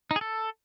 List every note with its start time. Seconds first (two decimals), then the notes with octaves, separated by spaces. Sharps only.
0.11 D#4
0.16 G#4
0.21 A4